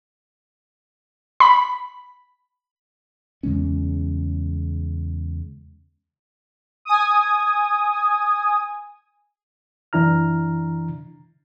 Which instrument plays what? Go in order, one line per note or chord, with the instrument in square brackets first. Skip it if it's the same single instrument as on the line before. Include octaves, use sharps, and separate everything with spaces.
[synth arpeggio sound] B5
[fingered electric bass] E2 C#3 G#3 C#4
[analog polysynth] G#5 D#6
[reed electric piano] F#2 E3 D4 E4 A#5 F6